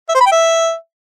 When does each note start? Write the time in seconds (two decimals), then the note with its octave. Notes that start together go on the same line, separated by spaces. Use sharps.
0.09 E5
0.15 C5
0.21 B5
0.26 G5
0.32 E5